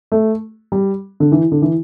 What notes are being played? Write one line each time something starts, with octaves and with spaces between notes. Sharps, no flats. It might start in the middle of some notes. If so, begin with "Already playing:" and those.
A3
G3
D3
E3
D3
E3